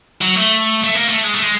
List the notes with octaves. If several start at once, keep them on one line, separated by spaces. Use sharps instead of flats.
F#3
A3
A3
A#3
A3
G#3
A3
G#3